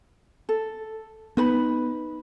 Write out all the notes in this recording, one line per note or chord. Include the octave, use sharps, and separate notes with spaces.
A4
B3 D#4 B4 B5